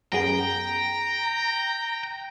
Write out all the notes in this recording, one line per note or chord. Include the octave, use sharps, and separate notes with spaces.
F#2 B3 G#4 G5 A#5